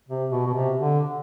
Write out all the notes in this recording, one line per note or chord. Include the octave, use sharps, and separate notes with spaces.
C3
B2
B2
C3
D3